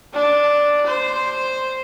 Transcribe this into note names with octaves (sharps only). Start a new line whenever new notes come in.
D4
C5